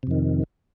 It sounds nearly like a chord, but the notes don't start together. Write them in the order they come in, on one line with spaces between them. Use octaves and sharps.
C3 F2 D#3